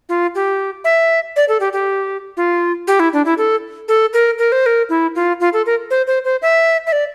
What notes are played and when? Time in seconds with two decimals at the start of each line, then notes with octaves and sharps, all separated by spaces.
0.09 F4
0.35 G4
0.84 E5
1.36 D5
1.48 A4
1.60 G4
1.73 G4
2.37 F4
2.87 G4
3.00 E4
3.13 D4
3.25 E4
3.38 A4
3.88 A4
4.13 A#4
4.38 A#4
4.52 C5
4.66 A#4
4.89 E4
5.15 F4
5.40 F4
5.53 A4
5.66 A#4
5.90 C5
6.07 C5
6.24 C5
6.42 E5
6.87 E5
6.92 D5